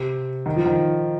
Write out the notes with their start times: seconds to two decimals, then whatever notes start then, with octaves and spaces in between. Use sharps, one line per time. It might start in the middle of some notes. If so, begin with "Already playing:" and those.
Already playing: C3
0.46 D#3
0.56 F3
0.66 D#3